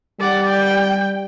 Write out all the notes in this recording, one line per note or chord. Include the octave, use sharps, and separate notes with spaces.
G3 D5 F#5
G5